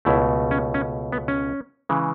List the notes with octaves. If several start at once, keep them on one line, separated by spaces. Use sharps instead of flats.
C#2 B2 A3 E4
C#4
C#4
B3
C#4
C#3 E3 G#3